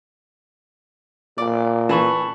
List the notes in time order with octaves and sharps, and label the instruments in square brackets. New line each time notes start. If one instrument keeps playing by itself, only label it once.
[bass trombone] A#2 [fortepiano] D5
[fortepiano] E3 [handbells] A5 B5 C#6